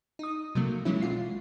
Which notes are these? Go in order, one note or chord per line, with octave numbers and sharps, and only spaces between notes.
D#4 D#6
C3 F#3 A3 A#3
E3 F#3 G#3 C#4 E4
B1 F4 C7